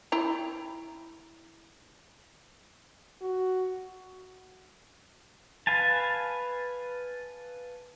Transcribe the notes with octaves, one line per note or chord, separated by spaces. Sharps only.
E4 G5 A#5
F#4
B4 F5 G#5 A5